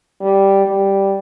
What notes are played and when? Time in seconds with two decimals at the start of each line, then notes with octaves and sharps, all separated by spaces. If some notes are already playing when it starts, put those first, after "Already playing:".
0.21 G3
0.65 G3